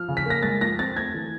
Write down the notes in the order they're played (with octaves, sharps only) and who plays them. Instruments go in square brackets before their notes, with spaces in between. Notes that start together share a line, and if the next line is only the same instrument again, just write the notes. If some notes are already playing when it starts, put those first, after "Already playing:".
Already playing: [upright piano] F3 F6
C#3
B6
A#3 A#6
G#3 A6
F3 A#6
C4 A6
A3 G#6
E3